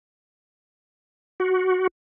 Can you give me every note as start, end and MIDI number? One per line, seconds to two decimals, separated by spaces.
1.40 1.87 66